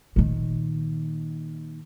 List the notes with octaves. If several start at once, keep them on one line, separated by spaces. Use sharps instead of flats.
A#2 D#3